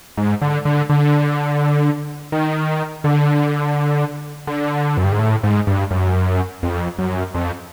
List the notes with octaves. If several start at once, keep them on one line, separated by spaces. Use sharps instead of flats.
G#2
D3
D3
D3
D#3
D3
D3
F#2
G2
G#2
A2
G#2
G2
F#2
F2
F#2
F2